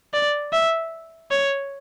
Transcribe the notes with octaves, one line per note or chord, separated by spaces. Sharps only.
D5
E5
C#5